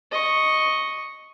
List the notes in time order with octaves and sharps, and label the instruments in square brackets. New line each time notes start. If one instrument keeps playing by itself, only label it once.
[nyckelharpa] D#5 C#6